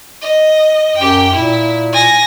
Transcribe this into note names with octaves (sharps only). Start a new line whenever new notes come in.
D#5
F#2 G4 G5
A#2 E4
G#5 A#6